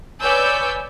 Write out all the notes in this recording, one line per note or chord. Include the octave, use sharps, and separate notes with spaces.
B4 C#5 D5 G#5 E6 G6